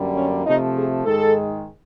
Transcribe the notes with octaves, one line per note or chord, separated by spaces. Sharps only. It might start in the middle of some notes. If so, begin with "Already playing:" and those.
Already playing: F#2 D3 G3 A#3
C#4
C3 F3 A3 D#4
G#4
G#2 D#3 G#3 A4